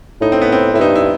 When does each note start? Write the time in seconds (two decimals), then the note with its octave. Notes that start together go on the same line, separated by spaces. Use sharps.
0.21 A2 D#4
0.32 C4
0.41 B3
0.52 C4
0.73 A2 E4
0.80 G2 D#4
0.95 E4